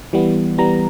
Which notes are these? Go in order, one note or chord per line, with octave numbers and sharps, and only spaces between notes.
E3 G3 B3
E3 G3 B3 A#5